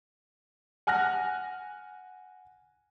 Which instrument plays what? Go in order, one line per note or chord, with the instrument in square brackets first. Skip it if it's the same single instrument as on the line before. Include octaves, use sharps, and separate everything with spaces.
[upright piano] F#5 G#5 F6 F#6 A#6